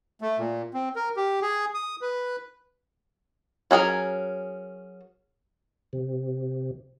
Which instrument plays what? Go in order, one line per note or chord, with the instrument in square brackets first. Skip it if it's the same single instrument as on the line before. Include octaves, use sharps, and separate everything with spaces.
[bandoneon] A3
A#2
C4
A#4
G4
G#4
D#6
B4
[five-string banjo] F#3 C#4 G#4 A#4
[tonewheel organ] C3